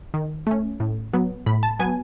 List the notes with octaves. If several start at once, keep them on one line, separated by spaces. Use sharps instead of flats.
D#3
A3 C#4
A2
F#3 B3
A2 B5
A5
F#3 B3 G#5